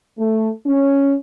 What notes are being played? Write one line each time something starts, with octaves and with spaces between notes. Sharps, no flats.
A3
C#4